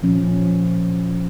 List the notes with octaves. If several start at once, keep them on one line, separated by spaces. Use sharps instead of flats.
A#2 F3 C#4